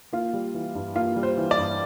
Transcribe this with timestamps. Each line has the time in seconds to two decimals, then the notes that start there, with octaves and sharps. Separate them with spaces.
0.13 A#3 F4
0.33 G3
0.54 E3
0.75 G2
0.96 A#3 F4
1.16 G3
1.23 C5
1.37 E3
1.51 D5
1.58 G2